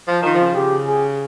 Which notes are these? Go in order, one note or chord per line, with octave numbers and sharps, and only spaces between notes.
F3
D#3 F4
C#3 F3
C#3 G4
G#4